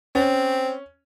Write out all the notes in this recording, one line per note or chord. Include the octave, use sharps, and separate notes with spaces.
C4 C#4